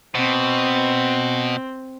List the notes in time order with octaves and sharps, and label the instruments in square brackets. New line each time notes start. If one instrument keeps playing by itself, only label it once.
[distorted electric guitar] B2 [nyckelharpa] C4